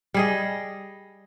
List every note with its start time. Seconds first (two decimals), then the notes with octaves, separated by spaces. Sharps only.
0.14 G3 G#4 D#5